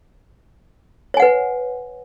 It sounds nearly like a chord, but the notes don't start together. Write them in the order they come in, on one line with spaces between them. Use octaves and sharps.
C#5 G#5 F#5 B4